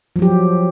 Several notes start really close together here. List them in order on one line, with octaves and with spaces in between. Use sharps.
F3 F#3 G4